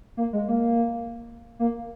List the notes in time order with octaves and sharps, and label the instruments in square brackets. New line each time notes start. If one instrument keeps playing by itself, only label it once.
[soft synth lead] A#3
G#3
A#3
A#3